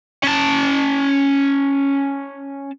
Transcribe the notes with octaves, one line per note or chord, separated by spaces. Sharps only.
C#4 A5